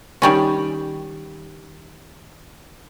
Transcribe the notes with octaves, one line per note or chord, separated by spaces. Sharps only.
D#3 G3 C#4